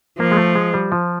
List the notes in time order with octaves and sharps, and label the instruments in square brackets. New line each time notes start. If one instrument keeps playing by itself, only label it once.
[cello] F3 [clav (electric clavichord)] A#3
[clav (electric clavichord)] G#3
A3
G#3
G3
F3